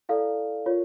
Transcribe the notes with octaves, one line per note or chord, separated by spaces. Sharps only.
E4 A4 D5 F5
F4 A#4 C#5